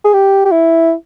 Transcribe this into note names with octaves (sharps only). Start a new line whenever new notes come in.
G#4
G4
G4
E4